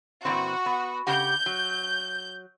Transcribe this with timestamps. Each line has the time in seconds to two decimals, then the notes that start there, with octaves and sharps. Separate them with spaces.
0.25 A#2 E3 C4 F#4
0.66 B3
1.07 C#3 G4 F#5 G6
1.46 F#3